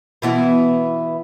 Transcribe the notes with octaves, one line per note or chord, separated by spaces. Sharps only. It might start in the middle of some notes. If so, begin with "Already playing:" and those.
B2 E3 B3